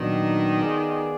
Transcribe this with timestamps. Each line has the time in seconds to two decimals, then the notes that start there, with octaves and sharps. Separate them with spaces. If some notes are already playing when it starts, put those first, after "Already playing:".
Already playing: A#2 D#3 F#3 B3 D4
0.60 B3 F4 G#4 D5